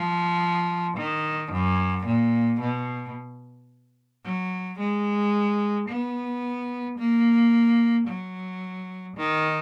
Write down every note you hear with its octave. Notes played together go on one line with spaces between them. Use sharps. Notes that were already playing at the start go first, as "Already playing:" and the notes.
Already playing: F3
D#3
F#2
A#2
B2
F#3
G#3
B3
A#3
F#3
D#3